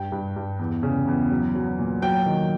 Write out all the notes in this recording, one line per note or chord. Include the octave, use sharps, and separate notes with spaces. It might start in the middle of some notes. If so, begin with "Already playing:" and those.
Already playing: G2 G5
G2
G2
E2
C#3
E2
F#3
F#3
A#2
F#3 G5
D#3